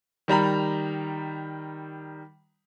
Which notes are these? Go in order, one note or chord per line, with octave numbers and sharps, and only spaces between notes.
D#3 G3 A#5 B5